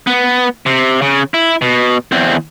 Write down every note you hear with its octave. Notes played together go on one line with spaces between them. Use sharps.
B3
C3
C#3
E4
B2
E2 C4